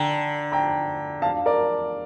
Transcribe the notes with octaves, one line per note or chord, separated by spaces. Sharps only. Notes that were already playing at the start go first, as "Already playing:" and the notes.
Already playing: D3 G5 A#5
G5 A#5
F5 A5
A#4 D5